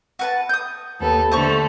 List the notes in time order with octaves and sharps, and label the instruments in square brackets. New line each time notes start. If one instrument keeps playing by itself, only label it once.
[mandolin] F#4 B4 A5
D#6 G6
[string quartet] D#2 B3 A4
[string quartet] D3 A3 [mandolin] C5 A5 C#6